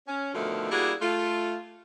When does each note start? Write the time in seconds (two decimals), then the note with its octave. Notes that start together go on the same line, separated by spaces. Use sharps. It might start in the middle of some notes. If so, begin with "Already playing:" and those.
0.08 C#4
0.34 B2 D3 D#3 F3 A3
0.71 G3 A#3 D4 E4 F#4 G#4
1.01 A3 F4